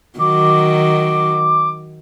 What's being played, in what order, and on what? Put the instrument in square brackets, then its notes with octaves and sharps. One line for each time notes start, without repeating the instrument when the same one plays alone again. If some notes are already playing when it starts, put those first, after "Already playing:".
[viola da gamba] D#3 F#3 [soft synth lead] D6